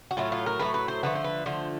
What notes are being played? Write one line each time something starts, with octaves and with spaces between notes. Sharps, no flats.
F#4
A2 F#3 A3 F4
F4
A#4
A2 F#3 A3 B4
B4
C5
D3 F3 A3 B4
C5
B4
D3 F3 A3 C5